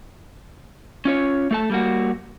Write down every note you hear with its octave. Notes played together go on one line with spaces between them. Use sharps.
C#4 F4 C#5
A3 A4 A5
G3 A#3 F#4